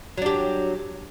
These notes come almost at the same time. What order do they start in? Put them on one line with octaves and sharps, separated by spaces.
F#3 D4 G4